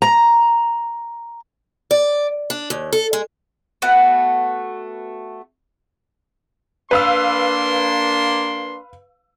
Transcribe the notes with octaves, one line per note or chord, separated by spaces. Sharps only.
A#5
D5
D4
D#2
A4
G#3
A3 B3 F#4
A#3 D4 B4 F5 C6 E6